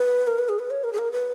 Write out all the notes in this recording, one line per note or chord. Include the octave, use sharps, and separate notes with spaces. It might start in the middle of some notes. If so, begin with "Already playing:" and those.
Already playing: B4
A#4
B4
G#4
B4
C#5
A#4
G#4
A#4
B4